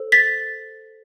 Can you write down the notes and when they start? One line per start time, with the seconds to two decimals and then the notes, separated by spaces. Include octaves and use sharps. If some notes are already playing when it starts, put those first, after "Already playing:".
Already playing: A4 C5
0.12 A6 B6